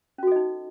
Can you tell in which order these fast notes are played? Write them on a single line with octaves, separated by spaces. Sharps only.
C#4 F#4 A4 D#5 D#4